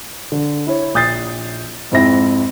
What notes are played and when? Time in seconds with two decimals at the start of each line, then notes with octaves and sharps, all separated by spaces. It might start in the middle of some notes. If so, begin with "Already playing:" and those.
0.32 D3
0.67 E4 C#5
0.94 A#1 D#6 G6 A6 C7
1.91 F2 G#2 C4 E4 E5 A#6